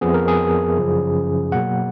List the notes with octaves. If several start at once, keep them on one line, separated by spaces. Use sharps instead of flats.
F2 F3 B3 G#4
A#4
G#4
F#2 C#3 F3
B2 F#3 A#3 F#5